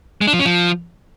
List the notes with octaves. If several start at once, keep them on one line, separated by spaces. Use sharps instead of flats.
G#3
D4
F3
C#4
F3